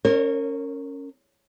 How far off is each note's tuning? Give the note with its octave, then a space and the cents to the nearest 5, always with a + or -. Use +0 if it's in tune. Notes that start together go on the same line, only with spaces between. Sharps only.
C#4 +0 A#4 -25 C#5 -40